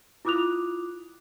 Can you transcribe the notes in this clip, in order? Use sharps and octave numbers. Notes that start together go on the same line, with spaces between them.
E4 F4 D6 D#6 F#6 F7